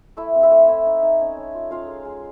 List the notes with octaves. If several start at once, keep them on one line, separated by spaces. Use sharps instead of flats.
A3 E4 E5
C4
E4 E5
A3
A3 E4 E5
D#4
D#4
C#4
C#4
F4
C#4 F4 F5
G#3
G#3